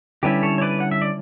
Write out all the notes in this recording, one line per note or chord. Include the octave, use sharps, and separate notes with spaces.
D3 G3 C#4 E4 G4 B4
A4 C#5
C#5
B4 D5
F#5
E5
D5